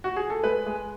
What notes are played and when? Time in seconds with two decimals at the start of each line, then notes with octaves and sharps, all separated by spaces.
0.04 F#4
0.16 G#4
0.30 A4
0.44 G#3 B4
0.67 G#3